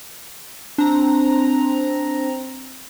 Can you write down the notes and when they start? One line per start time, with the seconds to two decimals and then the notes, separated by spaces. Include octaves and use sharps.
0.78 C4 D4 A#5